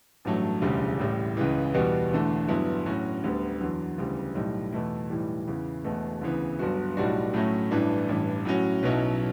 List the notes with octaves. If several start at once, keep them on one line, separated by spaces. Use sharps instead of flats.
A1 G2 F#3 A3
E1 D2 C#3 G3
A1 A2 G3
C#2 C#3 E3
E2 B2 G3 B3 F#4
E1 E2 D3 A3
G1 G2 F#3 B3 E4
A2 F#3 C#4 F#4
D2 D3 G3 B3
E2 D3 F#3
D2 C#3 E3 G3
B1 A2 G3
E2 B2 A3 E4
B1 A2 E3 G3
E2 C#3 E3
E1 E2 B2 A3
D2 C#3 E3 B3
G1 G2 F#3 B3 F#4
B1 A2 G3 D4 F#4
A2 F#3 A3 C#4 E4
A1 G2 E3 A3 D4
A1 G2 E3
A2 F#3 C#4 F#4
B1 B2 F#3 C#4 E4